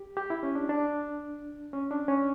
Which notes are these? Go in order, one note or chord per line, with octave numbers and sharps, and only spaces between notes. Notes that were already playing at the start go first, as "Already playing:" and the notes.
Already playing: G4
G4
E4
C#4
D4
D4
C#4
D4
C#4